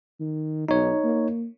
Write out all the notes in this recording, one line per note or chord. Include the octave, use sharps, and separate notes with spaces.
D#3
B1 D#4 C#5
A#3